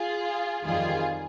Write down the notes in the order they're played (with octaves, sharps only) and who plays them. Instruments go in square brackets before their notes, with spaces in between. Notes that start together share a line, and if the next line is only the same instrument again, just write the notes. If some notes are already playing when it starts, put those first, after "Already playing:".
Already playing: [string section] F4 G#4
F2 D#3 G3 F4 G#4